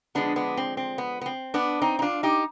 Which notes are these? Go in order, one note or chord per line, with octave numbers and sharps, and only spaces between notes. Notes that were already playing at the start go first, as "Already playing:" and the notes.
D3 F3 G#3 B3 D4
B3 D4
C4
C4
B3
B3
C4
B3 D4
C4 D#4
D#4
D4 F4
D#4 G4